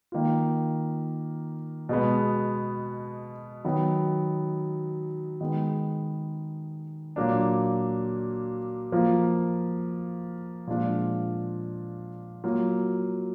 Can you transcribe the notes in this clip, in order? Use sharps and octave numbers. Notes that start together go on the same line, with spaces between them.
D#3 A#3 F4
B2 G#3 B3
D#3 F#3 B3
D#3 G#3 B3
A#2 F#3 A#3 D4
F3 A#3 F4
A#2 F3 G#3 D4 F4
F#3 A#3 F4